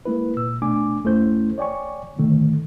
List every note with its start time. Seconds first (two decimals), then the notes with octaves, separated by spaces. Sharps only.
0.05 G#3 A#3 E4 B4
0.37 A#2 E6
0.62 B2 A3 D4 G#5 D6
1.04 E2 A3 C#4 E4 C5 G6
1.58 C#5 D5 G5 G#5 C#6
2.16 G#2 B2 D3 D#3 A3